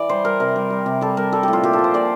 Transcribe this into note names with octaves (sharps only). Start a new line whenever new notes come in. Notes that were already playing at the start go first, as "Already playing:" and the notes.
Already playing: E3 D5
G3 C5
G3 A#4
C3 A#4
G3
G3
C3
G3 A4
G3 A#4
G3 A4
A2 G4
F4
A#2 G4
A4
F3
C5
A#2 D5